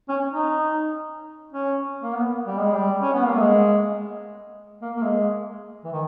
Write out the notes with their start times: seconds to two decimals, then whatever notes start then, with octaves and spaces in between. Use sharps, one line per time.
0.09 C#4
0.30 D#4
1.52 C#4
2.02 A#3
2.14 B3
2.45 G3
2.59 G#3
2.73 G3
3.02 C#4
3.13 B3
3.25 A#3
3.38 G#3
4.82 A#3
4.96 A#3
5.02 G#3
5.84 E3
5.92 D#3